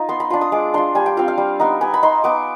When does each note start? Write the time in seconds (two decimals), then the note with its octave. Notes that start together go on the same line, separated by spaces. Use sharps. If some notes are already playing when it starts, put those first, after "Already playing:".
Already playing: D#4 F4
0.09 B3 C6
0.20 B5
0.30 D4 F4 C6
0.41 D#6
0.52 G#3 D6
0.74 D4 F4 C6
0.95 G3 G#5
1.06 G5
1.17 C4 F4 F5
1.28 F5
1.38 G3
1.60 B3 D#4
1.81 B3 G#5
1.94 B5
2.03 D#4 C6
2.24 B3 D6